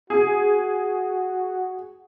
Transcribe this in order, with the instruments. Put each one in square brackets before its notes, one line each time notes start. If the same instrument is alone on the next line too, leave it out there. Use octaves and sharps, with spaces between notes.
[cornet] F#4 [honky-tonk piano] G#4